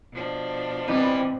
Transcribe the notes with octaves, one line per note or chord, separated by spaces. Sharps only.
B2 F3 D4
E3 G3 B3 C4 D#4 B4